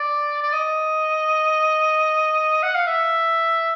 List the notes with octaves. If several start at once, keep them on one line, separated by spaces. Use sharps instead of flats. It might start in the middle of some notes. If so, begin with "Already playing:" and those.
Already playing: D5
D5
D#5
F#5
F5
E5